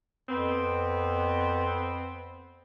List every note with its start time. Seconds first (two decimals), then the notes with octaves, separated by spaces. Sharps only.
0.29 F2 B3 C4